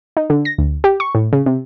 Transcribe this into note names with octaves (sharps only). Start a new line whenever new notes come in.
D#4
D3
A#6
D2
G4
C#6
A2
C#3
C3